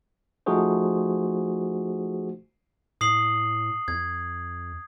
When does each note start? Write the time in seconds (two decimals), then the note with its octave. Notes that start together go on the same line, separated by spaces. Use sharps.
0.46 F3 A3 D#4 F#4 G#4 C5
3.01 A2 D#6 C7 F#7
3.88 F2 G#6